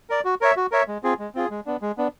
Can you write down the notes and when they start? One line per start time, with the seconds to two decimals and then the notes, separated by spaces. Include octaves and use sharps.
0.10 A#4 D5
0.25 F#4
0.41 A#4 C#5 E5
0.57 F#4
0.72 A#4 C#5 E5
0.88 G#3
1.03 C4 F4 G#4
1.19 G#3
1.35 C4 F4 G#4
1.50 G#3
1.66 B3 D4
1.82 G#3
1.98 B3 D4